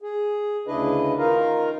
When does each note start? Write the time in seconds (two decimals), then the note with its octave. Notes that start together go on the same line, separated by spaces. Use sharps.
0.02 G#4
0.67 D2 C#3 D4 E4 B4 D#5
1.18 D#3 D#4 F4 A#4 F5 A#5